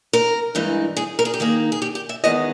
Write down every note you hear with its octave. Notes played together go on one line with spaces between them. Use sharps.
A#4
G2 E3 G#3 D#4
G#4
A#4
G#4
G4
D#3 A#3 D#4 G#4
G#4
G4
G4
E5
E2 D#3 G#3 B3 D#5